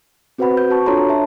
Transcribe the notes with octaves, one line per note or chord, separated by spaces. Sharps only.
C4 F#4 B4 C5 F#5 B5
G6
F#4 A5 C#6
D4 F4 A4 C#5 A#5 C6
E5 A5